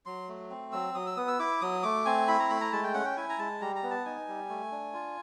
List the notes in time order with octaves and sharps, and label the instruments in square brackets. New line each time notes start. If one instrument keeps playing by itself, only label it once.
[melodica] F#3 C6
A3
C4
F#3 E6
F#3 D#6
E6
B3 D#6
E6
E4 D6
F#3 D#6
A3 D6
C4 G#5
E4 B5
A#5
A3 B5
A#5
G#3 A5
G5
C#4 F#5
G5
E4 G#5
A#5
G#3 A5
G3 A#5
A#5
B3
A5
D#4 G#5
G3
A3
D4
F4